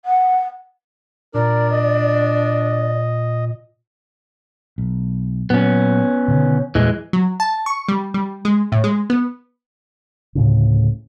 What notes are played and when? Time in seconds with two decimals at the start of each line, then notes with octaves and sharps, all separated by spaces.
0.05 F#5
1.34 A#2 D4 A#4 D5
1.71 D#5
4.78 B1
5.50 A#2 F#3 B3 C#4
6.28 B2 D3 D#3
6.75 E2 G2 A#2 E3 G#3
7.13 F#3
7.40 A5
7.66 C#6
7.89 G3
8.14 G3
8.45 G#3
8.72 A2
8.84 G#3
9.10 B3
10.35 D2 A2 C#3